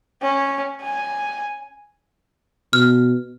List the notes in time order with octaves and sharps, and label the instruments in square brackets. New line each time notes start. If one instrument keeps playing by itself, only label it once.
[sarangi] C#4
G#5
[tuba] B2 [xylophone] F6